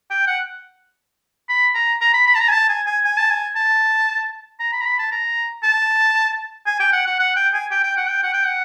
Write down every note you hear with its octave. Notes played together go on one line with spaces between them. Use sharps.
G5
F#5
B5
A#5
A#5
B5
B5
A5
A#5
G#5
A5
G#5
G#5
G#5
A5
G#5
A5
A#5
B5
A#5
B5
A5
A#5
A5
G#5
G5
F#5
F#5
F#5
G5
G#5
G5
G5
F#5
G5
F#5
G5
F#5